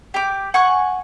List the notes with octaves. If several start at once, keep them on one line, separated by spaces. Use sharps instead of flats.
G4 D6
F#5 G#5 C#6 F#6